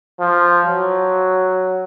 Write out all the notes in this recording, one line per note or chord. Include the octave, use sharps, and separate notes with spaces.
F3
F#3